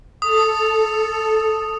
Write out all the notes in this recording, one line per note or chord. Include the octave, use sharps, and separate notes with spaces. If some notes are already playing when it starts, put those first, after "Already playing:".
A4 D#6